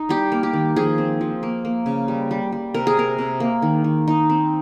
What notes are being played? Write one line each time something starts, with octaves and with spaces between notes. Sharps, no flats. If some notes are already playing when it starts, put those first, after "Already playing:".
Already playing: D#4
G3 G4
A#3
G4
D#3
F3 G#4
C4
F3
A#3
A#3
C#3
G3
G3
G3
C3 A#4
G#4
C3 A#4
C3
A#3
D#3
D#3
D#4
C4